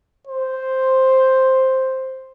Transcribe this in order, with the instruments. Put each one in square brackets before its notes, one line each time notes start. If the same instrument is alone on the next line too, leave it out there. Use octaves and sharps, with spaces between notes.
[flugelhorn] C5